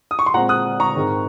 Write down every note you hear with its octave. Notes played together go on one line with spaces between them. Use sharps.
D#6
C#6
C6
A#2 G#3 C4 F#5 A#5
D#6 F#6
A#5 C#6
G#2 D#3 G#3 C4